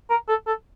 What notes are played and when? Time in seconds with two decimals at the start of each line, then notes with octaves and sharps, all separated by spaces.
0.10 A#4
0.28 A4
0.47 A4